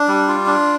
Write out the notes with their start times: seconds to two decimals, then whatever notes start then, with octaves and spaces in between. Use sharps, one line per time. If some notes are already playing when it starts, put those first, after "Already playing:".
Already playing: D4
0.08 G3
0.28 F4
0.46 D4